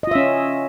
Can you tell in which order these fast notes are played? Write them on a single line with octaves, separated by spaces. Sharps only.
D#5 F4 E5 C#4